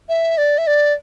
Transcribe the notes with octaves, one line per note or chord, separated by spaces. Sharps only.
E5
D5
E5
D5